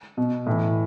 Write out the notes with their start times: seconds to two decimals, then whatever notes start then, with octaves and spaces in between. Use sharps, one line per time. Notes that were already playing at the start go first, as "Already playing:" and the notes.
0.17 B2
0.46 A2 E3